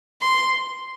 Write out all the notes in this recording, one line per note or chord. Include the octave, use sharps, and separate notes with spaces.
C6